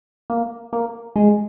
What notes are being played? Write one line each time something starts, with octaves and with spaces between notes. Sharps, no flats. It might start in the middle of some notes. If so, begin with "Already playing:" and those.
A#3
A#3
G#3